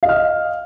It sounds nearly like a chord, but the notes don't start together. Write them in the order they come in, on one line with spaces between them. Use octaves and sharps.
F5 D#5 F6